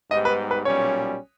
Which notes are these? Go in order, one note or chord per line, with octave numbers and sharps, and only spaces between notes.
G#2 G3 B3 D#4 G4 D#5
B4
B4
B1 A#2 G3 C#4 C#5